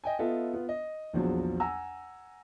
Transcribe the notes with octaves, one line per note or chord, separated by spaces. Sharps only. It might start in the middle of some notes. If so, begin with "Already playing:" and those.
D#5 G5 G#5
B3 F4 A4 D#5 E5
B3 F4
D#5
A#1 E2 F3 F#3
F#5 G#5 A#5 E6